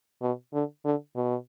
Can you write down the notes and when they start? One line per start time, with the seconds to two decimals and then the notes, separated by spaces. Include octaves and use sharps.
0.22 B2
0.53 D3
0.85 D3
1.16 B2